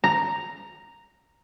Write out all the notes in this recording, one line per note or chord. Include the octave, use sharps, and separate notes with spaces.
A#5